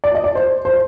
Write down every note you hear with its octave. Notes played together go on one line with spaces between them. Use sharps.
D5
D#5
D5
C5
C5